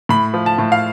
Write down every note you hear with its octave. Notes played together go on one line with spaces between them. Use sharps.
A2 B5
F3
A5
A2
F5